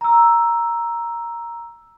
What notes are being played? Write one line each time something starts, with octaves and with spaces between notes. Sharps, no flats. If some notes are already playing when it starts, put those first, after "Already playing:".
A#5 E6